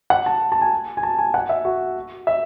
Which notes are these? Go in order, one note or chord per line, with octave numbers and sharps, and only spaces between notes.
F#5
A5
A5
G#5
G#5
A5
G#5
F#5
E5
F#4
E5